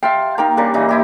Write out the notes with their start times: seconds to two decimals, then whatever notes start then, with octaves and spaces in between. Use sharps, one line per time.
0.03 E5 F5 G5 A5 C6
0.38 A#3 D#4 G5 A#5
0.57 C#3 G3 D4 A#4
0.74 A#2 E3 D#4
0.89 D#4 E4 G4